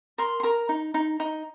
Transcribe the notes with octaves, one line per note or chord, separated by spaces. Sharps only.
A#4 C6
C6
A#4 A#5
D#4
D#4
D#4